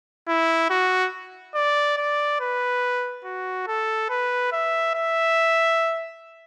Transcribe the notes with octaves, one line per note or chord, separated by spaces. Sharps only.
E4
F#4
D5
D5
B4
F#4
A4
B4
E5
E5